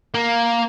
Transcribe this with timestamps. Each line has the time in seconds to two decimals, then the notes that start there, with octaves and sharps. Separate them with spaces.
0.15 A#3